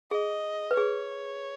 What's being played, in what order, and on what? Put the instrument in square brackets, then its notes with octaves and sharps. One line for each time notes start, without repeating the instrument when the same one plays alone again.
[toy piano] G#4 [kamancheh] D#5
[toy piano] B4
[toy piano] G#4 [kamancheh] C#5